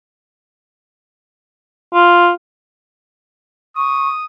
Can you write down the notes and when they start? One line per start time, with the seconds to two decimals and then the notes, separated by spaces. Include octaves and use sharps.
1.93 F4
3.76 C#6 D#6